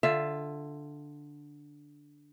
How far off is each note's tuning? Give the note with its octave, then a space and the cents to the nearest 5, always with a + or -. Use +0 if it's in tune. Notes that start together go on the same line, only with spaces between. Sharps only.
D3 +0 F4 +0 E5 +10